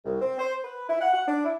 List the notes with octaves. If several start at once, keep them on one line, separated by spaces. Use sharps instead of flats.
C2
C4
C5
B4
E4
F#5
F#5
D4
E4